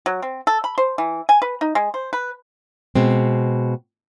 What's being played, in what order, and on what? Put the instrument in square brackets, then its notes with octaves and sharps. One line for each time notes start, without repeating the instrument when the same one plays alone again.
[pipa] F#3
C4
A4
B5
C5
E3
G#5
B4
D#4
G#3
C5
B4
[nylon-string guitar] B2 G#3 C4